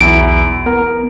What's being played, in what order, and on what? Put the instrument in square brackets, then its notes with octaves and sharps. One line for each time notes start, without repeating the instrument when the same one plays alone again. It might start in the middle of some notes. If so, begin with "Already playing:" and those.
[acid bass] B1 [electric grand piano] E2 E4 [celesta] D7
[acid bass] B3 [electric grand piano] A#4